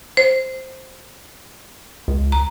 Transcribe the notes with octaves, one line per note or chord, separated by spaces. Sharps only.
C5
C#2
A#5